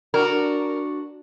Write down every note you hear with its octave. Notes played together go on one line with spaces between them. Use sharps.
D4 F#4 A#4